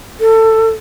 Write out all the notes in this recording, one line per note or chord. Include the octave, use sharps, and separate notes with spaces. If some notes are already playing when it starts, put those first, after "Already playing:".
A4